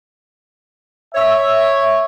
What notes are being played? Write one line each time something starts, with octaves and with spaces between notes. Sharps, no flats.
C#5 E5